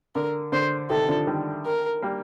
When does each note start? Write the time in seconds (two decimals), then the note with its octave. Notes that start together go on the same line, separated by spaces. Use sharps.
0.15 D3 A#4
0.52 D3 C5
0.89 C3 D#3 A4
1.08 D3 F3
1.27 D#3 G3
1.65 A#4
2.02 G3 A#3